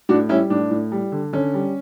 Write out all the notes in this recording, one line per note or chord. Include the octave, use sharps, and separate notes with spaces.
A2 D4 F#4
G3 C#4 E4
A2 D4
A2
G3
D3
D3 C#4
G3